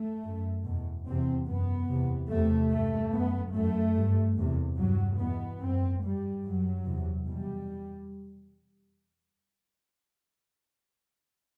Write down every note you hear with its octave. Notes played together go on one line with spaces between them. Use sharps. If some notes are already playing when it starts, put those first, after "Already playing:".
Already playing: A3
F#2
E2 B2
E2 C3 C4
F#2 B3
E2 C3
E2 C3 A3
G2 A3
F#2 B3
F#2 A3
G2
E2 C3
G2 F#3
E2 B2 B3
F#2 C4
G2 G3
F#2 F#3
E2 C3
E2 B2 G3